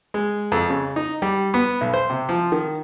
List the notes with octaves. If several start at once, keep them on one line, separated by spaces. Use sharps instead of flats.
G#3
F2
C#3
D#4
G3
B3
B1
C5
C3
F3
D#3